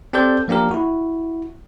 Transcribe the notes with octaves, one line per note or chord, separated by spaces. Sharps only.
C4 G4 A4 C5 D5 G6
F3 A#3 D4 G4 A#4
E4 F#4